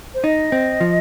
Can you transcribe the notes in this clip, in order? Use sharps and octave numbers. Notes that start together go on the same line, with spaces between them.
C5
D#4 D#5
C4
F3